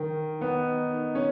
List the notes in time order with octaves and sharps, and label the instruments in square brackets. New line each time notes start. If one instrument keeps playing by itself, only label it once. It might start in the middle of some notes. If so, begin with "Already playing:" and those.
Already playing: [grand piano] D#3
[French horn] D#3 [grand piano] B3
[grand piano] C#4